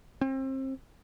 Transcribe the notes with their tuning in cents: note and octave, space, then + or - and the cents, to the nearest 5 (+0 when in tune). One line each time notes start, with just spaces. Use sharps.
C4 +30